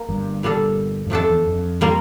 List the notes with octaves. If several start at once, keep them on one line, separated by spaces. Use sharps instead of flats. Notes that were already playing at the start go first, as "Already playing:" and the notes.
Already playing: A#3
G1 G2
A#2 G3 D4 A4
G2
F2 F3 A3 D4 A4
E2
F2
G3 A#3 F4 A#4